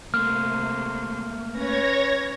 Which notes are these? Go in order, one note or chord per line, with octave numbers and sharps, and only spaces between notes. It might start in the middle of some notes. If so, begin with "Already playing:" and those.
C3 A3 A#3 C6 F6
C#4 B4 C#5 G#6 A#6